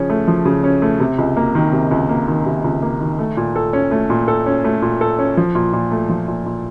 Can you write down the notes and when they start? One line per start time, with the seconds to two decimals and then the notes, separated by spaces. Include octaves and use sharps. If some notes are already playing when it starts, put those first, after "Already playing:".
Already playing: C#3 F3 C#4
0.10 A3
0.28 F3
0.45 C#3
0.64 C#4
0.82 A3
1.00 C3
1.18 C#2
1.37 A#3
1.55 D#3
1.73 C3
1.91 C#2
2.09 A#3
2.28 D#3
2.46 C3
2.64 C#2
2.82 A#3
3.00 D#3
3.19 A3
3.37 A#2
3.56 A4
3.73 C#4
3.91 A3
4.10 A#2
4.28 A4
4.46 C#4
4.64 A3
4.82 A#2
5.01 A4
5.19 C#4
5.37 F3
5.55 A#2
5.73 A#2
5.91 A3
6.09 F3
6.28 A#2
6.46 A#2